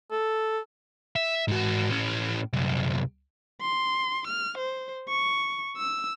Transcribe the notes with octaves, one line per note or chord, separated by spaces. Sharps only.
A4
E5
G#2 F#4
A2 C#4
C2 F#2
C6
F6
C5
C#6
E6